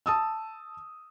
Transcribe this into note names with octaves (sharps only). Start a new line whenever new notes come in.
A5 D#6 E6